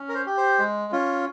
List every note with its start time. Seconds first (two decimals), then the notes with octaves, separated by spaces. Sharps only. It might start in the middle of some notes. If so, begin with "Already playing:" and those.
Already playing: C#4
0.09 A#4
0.15 C5
0.26 G4
0.37 C5
0.59 G#3
0.92 C#4 F4